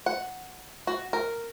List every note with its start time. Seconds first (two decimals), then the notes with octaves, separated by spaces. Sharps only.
0.06 F#5
0.87 F#4
1.13 A#4